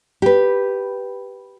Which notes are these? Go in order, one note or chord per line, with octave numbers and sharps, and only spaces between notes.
G4 B4